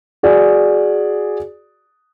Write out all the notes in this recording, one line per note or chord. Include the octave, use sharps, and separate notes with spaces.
F#4 G#4 D5